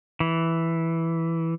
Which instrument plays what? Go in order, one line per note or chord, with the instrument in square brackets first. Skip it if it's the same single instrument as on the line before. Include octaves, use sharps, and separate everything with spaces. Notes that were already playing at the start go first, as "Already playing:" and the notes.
[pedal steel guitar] E3